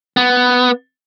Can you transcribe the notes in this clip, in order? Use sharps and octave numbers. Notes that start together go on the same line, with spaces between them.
B3